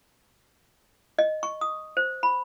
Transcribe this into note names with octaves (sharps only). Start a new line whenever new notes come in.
D#5
C#6
D#6
C5
B5